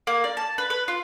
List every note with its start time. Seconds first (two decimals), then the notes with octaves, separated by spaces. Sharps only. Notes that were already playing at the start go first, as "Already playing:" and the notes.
0.07 A#3
0.24 D5
0.37 A5
0.58 B4
0.70 B4
0.88 F4